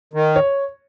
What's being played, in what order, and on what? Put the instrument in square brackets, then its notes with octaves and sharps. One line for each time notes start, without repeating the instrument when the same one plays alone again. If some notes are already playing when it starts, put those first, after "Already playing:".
[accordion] D#3
[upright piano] C#5